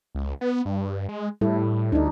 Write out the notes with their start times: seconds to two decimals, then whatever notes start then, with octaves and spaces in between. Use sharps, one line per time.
0.15 C#2
0.41 B3
0.65 G2
1.09 G#3
1.41 A2 G3 E4 A4
1.92 D2 D4 D#4